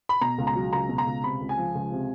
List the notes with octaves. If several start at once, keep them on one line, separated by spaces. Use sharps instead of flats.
B5
B2 A#5
C#2
A#5
F#3
C#2 A#5
B2
A#5
C#2
C3 B5
C#2
G#5
F3
C#2
C3